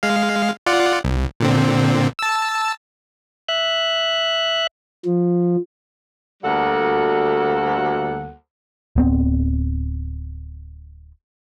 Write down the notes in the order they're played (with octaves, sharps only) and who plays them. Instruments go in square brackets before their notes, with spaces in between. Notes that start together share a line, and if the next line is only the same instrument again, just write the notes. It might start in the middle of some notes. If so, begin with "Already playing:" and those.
[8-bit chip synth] G#3 F5
F4 D5 F#5
C2
A#2 D3 C4
A5 E6
[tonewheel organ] E5 F#6
[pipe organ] F3
[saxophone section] D2 G3 A#3 F#4 A4 F#5
[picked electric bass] D1 B3 C4